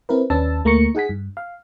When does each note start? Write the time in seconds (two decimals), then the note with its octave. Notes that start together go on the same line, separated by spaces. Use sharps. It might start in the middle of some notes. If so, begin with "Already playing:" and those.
0.09 C4 E4 A#4 B4
0.30 D#2 C#4 D4 B4 A5 E6
0.65 D2 A3 A#3 A#5 C#6 C#7
0.95 D#4 G#4 F#5 G#5 B6
1.09 G2
1.37 F5